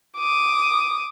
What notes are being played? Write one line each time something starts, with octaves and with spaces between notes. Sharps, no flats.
D6 D#6